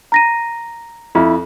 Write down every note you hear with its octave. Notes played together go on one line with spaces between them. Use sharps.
A#5 A#6 D#7
F2 E4